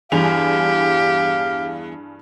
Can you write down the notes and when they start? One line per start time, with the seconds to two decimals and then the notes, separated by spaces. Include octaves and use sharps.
0.12 E2 G2 G4 G#4 F5 F7